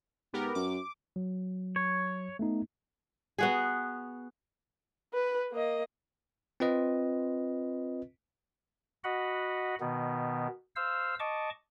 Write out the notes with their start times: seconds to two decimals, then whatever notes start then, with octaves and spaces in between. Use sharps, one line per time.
0.33 G#2 B3 G4 A#4
0.55 F#2 D6
1.16 F#3
1.76 C#5
2.39 A3 B3 D#4
3.38 B3 F#4 G#4
5.13 B4
5.52 A#3 D#5
6.60 C4 F4 B4 D#5
9.04 F#4 D#5 F#5 B5
9.80 B2 D#3 B3
10.76 C5 F5 E6
11.20 D#5 A5 C#6 D6